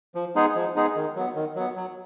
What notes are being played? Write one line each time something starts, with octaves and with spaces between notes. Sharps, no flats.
F3
G#3 B3 D#4 G#4
F3
G#3 B3 D#4 G#4
D#3
F#3 B3
D#3
F#3 B3
F#3